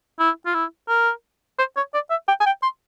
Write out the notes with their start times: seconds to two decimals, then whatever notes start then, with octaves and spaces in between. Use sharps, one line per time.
0.19 E4
0.46 F4
0.54 E4
0.89 A#4
1.58 C5
1.76 C#5
1.94 D5
2.10 E5
2.28 G5
2.40 G#5
2.46 G5
2.63 C6